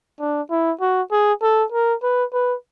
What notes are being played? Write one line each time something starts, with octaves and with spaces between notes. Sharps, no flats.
D4
E4
F#4
G#4
A4
A#4
B4
B4